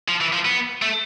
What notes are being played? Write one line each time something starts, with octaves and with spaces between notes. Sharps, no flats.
F3
E3
F3
B3
A3